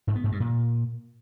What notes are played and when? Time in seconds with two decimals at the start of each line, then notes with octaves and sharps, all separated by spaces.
0.07 G#2
0.16 B3
0.24 G#2
0.32 G2
0.40 A#2